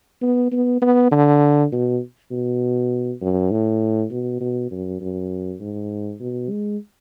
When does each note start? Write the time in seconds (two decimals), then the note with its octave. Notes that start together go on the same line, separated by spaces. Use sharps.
0.22 B3
0.52 B3
0.82 B3
1.12 D3
1.72 B2
2.31 B2
3.21 F#2
3.51 A2
4.11 B2
4.41 B2
4.71 F#2
5.01 F#2
5.61 G#2
6.20 B2
6.50 G#3